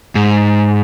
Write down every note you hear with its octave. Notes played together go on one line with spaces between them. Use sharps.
G#2